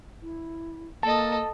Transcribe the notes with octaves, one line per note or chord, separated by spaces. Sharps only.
E4
A#3 A4 D#5 A5